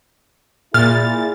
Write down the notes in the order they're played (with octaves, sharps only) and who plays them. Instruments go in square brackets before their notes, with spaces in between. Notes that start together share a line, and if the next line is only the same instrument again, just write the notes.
[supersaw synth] A#2 A6 [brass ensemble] E4 G#4 [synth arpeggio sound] F6